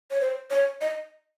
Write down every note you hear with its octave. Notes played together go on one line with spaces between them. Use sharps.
C#5
C5
C#5
D#5